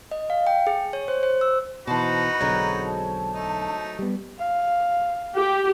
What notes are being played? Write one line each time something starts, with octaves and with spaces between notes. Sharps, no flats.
D#5
F5
G5
G#4
C#5
C5
C5
E6
B2 E3 D#4 F#4 B4 C5 A5 B5
B1 D3 F#3 G#3 C4 A#5
A5
A3 D#4
G3 B3
F5
G4